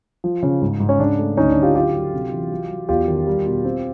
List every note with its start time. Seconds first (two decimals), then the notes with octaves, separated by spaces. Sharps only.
0.24 F3
0.43 C#3
0.62 G#2
0.80 G#2
0.89 C#4
0.99 C#3 D4
1.19 A3
1.37 D2 C#4 D#4
1.50 D4
1.56 D2
1.62 F4 G4
1.75 F#3 F4 G4
1.94 F#3
2.13 C3
2.32 E3
2.51 F#3
2.70 F#3
2.89 E2 F4 G4
3.08 D#3
3.27 G3
3.46 B2
3.65 C4